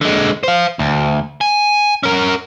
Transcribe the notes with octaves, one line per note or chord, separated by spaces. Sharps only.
D3 G#3
C5 F5
D2
G#5
C#4 A#4